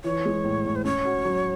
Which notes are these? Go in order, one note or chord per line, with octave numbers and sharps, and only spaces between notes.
E3 C#5
G#3
A2
A2
C5
C#4 C#5
F#4
F#3